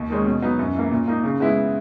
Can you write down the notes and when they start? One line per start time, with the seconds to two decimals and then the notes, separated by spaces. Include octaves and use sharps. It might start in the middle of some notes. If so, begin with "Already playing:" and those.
Already playing: D#2
0.10 D#3 G#3 C#4
0.26 B2
0.42 F#3 B3 D#4
0.59 F#2
0.75 E3 A#3
0.91 A#2
1.08 A#3 D#4
1.24 C#3
1.40 G#3 B3 E4